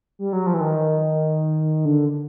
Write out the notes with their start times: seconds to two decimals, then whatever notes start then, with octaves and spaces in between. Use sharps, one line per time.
0.19 G3
0.33 F#3
0.47 F3
0.54 E3
0.60 D#3
1.85 D3